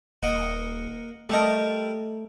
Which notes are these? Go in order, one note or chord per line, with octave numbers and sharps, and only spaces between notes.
D#1 A#3 D#5 F#5
G3 A3 G4 A4 A#4 D#5